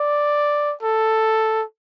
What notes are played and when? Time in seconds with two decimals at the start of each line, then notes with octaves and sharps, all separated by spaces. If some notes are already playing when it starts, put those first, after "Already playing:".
Already playing: D5
0.83 A4